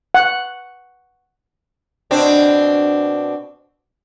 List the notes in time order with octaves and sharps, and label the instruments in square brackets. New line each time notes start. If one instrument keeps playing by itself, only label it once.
[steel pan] F#5
[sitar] B2 C4 D4